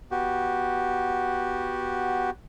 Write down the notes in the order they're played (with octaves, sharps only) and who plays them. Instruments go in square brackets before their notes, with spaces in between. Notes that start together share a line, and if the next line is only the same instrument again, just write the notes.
[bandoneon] B3 F#4 G4